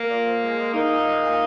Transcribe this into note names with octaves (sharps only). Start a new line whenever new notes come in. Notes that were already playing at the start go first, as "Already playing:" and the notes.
Already playing: A#3
A#2
F3
G#3
G#3
G#3 A#3 D#4
A#2
G#3
A#2